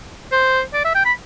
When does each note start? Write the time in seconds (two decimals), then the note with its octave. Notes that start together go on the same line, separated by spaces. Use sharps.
0.32 C5
0.73 D5
0.85 E5
0.95 G5
1.05 B5